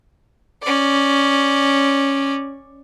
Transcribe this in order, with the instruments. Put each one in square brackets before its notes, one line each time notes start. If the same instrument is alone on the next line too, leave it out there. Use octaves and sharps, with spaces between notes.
[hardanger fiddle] C#4 D5